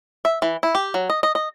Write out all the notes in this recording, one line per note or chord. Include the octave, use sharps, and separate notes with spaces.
E5
E3
E4
G4
F#3
D#5
D#5
D#5